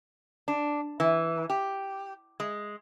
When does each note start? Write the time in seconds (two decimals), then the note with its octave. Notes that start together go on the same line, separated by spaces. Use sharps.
0.48 D4
1.00 E3
1.50 G4
2.40 G#3